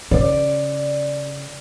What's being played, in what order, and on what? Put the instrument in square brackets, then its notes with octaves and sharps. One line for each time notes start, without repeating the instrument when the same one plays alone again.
[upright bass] C#3 [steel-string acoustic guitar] D5